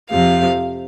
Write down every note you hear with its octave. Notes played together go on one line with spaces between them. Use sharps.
F2 C3 F3 F5